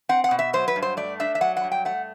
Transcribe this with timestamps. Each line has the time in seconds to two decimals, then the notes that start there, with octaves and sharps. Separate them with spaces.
0.09 C4 F#5
0.24 F#5
0.31 B2
0.39 E5
0.53 F#3 C5
0.68 B4
0.76 G2
0.82 C5
0.97 A3 D5
1.20 D4 E5
1.35 E5
1.41 F#3 F#5
1.57 F#5
1.64 G2
1.72 G5
1.85 A3 F#5